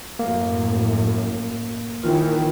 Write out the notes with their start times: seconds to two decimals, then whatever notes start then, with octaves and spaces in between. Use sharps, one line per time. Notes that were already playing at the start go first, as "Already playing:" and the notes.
0.19 F#2 A2 A#3
2.03 D#2 D#3 E3 F4